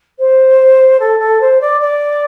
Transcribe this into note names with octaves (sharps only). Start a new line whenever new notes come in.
C5
A4
A4
C5
D5
D5